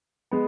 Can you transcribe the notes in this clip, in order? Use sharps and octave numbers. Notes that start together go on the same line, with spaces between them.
G#3 B3